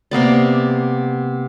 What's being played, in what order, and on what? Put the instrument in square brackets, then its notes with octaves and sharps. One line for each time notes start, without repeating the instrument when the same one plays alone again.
[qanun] C3 A#3 B3 D5